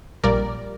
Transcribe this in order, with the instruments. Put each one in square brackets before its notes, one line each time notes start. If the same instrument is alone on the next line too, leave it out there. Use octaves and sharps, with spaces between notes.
[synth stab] A#1 A#2 G3 A#4 D5